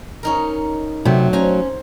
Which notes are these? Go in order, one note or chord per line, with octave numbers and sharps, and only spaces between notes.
C#4 D#4 A#4
C3 F#3 A3
C#4 C5 G#5 A#5